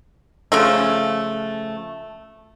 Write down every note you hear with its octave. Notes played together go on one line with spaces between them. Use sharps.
C#3 F3 A3